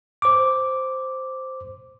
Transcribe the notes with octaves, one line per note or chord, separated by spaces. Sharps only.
C5 D6